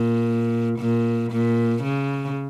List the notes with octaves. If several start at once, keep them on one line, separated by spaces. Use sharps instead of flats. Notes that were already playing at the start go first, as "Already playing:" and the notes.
Already playing: A#2
A#2
A#2
C#3